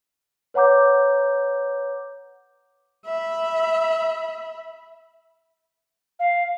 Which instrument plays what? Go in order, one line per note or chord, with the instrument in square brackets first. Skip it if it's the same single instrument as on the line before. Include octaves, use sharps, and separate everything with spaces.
[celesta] B4 C#5 F#5 A#5 D6 G6
[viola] E5 B5
[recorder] F5